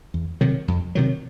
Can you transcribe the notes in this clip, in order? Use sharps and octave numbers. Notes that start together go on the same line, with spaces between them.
E2
C3 D#3 F#3
F2
C3 D#3 F#3